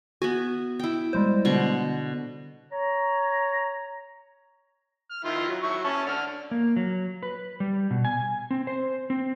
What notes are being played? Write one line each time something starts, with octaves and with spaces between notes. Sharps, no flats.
B3 F#4 E5 G#5
E4 G5
G3 G#3 C5
B2 D3 C#6
C#5 A#5
F6
D#3 E4 F4
F#3
F#3 E4 C#6
C#4 C#5 A5
D3 F6
A#3
F#3
B4
G3
B2
G#5
C4
C5
C4